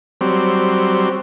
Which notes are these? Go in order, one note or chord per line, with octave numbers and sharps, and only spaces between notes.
F#3 G3 C4